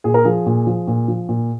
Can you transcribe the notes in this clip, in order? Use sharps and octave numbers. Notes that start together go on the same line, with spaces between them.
A#2 G#4
A#4
F3 G#4
A#2
F3
A#2
F3
A#2